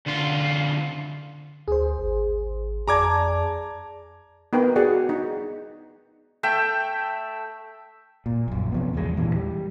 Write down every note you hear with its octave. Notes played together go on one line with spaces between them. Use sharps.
D2 F4
D2 G#4 C5
G#1
F2 G#4 D5 A5 A#5 D6 G#6
B3 D#4 A#4 B4 G5
F#4 G#4 D5 F#5
D#4
A3 E5 G5
A#2
A#1 F#2
C3 F3 B3
A1 E2 G2 G#3
E2 G2 A#2 E3
G3